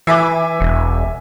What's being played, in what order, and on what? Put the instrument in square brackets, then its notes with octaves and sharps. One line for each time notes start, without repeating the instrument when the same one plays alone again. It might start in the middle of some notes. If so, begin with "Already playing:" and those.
[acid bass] E3 [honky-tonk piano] E5 G#5 D6
[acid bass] E1